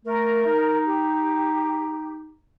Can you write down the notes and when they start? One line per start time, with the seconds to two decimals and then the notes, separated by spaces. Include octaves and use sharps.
0.05 A3 A#4
0.46 D#4
0.85 G4